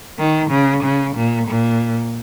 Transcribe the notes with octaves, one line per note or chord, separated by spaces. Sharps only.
D#3
C#3
C#3
A#2
A#2